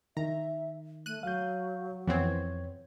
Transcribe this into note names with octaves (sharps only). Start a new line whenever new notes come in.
D#3 E5 A#5
A3 F#6 D#7
F#3 F5 G6
F2 E3 B3 C4 C#5 G#6